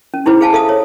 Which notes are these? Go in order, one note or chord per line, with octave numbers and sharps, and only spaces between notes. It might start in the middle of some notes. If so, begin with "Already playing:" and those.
C#4
D#4 E4 G#4 B4 C5
G#4 C5 F5 G#5 A5
A4 E5 F5 D#6
C#5